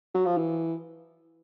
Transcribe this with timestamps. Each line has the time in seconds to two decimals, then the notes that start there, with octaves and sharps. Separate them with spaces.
0.15 F#3
0.26 F3
0.37 E3